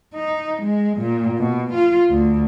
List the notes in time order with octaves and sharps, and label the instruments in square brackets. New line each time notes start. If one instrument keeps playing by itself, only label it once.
[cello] D#4
G#3
A#2
B2
F4
D2